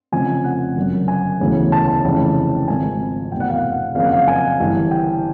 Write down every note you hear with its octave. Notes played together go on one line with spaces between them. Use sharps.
F1 F2 C#3 F3 G#5
F#5
G1 F#2 C#3
G#5
E1 D2 C#3 E3
A5
A5
F1 F2 C#3 E3
G#1 G#2 F3 G#5
F1 E2 B2 G5
F#5
F5
F#5
F#1 F2 C#3 F5
F#5
F5
G#5
G1 G2 E3
G5